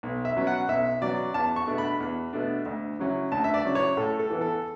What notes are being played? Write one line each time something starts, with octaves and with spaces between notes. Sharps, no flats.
B1
E5
B2 F#3 C#4
F#5
B1 E5
B2 F#3 C#4 D5
E2 A5
C#6
B2 A3 D4
B5
E2
B2 A3 D4
D2
C#3 F#3 C#4 E4
D2 A5
E5
D5
C#3 F#3 C#4 E4
C#5
A2 A4
A4
E3 B3
A4